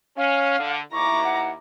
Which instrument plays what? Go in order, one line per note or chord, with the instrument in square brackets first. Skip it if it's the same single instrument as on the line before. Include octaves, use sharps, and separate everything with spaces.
[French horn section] C#4 [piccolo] F5
[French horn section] D3
[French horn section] D#2 E4 [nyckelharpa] A#5 D6 [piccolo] C#6
[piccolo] F#5